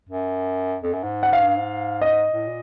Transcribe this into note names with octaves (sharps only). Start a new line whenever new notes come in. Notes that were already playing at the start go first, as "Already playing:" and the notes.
F#2
F2
F#2
G#2
F#5
F5
G2
G#2
D#5
A2
A#2